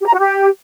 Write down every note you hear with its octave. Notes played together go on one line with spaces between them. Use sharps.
G4
A#5
F#4
G4